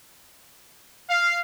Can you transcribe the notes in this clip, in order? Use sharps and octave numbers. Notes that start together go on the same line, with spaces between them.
F5